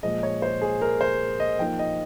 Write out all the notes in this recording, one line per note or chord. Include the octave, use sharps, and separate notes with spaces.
A#2 F3 G#3 D#5
C#5
C5
G#4
A#4
C5
D#5
F3 A#3 D#4 G5
D#5